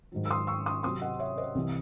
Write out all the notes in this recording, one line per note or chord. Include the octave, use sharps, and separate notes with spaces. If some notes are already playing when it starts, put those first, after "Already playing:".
G#2 D#3 F#3
E6
C6 D#6
C#6 E6
C6 D#6
C3 F#3 C4 C6 D#6
D#5 F#5
C#5 E5
C5 D#5
C2 C3 E3